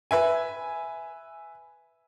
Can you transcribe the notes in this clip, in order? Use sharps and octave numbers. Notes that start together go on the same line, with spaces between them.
B4 E5 G#5